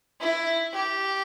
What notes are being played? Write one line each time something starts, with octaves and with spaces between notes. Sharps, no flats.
E4
G4